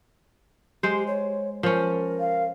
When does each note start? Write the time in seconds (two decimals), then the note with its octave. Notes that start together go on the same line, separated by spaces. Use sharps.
0.83 G#3 G4 C5
1.07 C#5
1.63 F3 C#4 A#4
2.20 F5